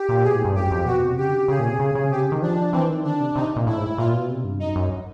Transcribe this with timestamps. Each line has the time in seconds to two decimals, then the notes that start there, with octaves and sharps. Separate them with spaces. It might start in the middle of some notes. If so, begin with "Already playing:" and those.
Already playing: G4
0.09 A#2
0.24 B2 G#4
0.34 A2
0.45 G2
0.55 F#2 G4
0.71 F2
0.86 B2 F#4
1.02 C3
1.18 C#3 G4
1.28 D3
1.38 C#3
1.48 C#3 G#4
1.59 A#2
1.69 C3
1.79 C#3
1.95 C#3
2.11 C3 G4
2.21 C#3
2.32 D#3
2.42 F3 D4
2.73 E3 C4
2.89 D#3
3.04 D3 D4
3.20 C3
3.36 C3 D#4
3.56 A#2
3.66 A2 E4
3.77 G#2
3.98 A#2 F4
4.13 B2
4.29 C3
4.44 G2
4.60 F#2 D#4
4.76 F#2